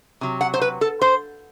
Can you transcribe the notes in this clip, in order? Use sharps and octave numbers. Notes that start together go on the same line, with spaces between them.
C3 F#3
F#5
C5
B4
A4
C5